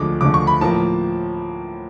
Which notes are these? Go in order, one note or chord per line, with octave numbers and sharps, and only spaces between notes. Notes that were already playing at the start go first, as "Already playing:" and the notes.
Already playing: D2 D3 F3 G#3 D6
D2 D3 F3 G#3 D6
C#6
B5
A2 F3 A#3 A5